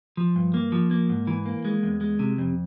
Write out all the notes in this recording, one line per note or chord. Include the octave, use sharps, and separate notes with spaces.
F3
G2
A#3
F3
A#3
G#2
E3
A#3
G#3
E2
G#3
C3
F2